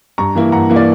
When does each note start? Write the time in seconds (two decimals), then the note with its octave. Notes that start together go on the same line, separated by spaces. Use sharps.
0.18 G2 A#5 C#6
0.35 E3 A#3 E4
0.52 G2 F#5 A#5
0.70 E3 A#3 E4
0.76 D5